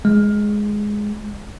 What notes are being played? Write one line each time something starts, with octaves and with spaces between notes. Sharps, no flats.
G#3